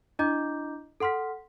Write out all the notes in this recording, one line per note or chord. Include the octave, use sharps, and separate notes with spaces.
D4 E4 D#5 A#5 D6 G6
A4 F#5 C6 F6 B6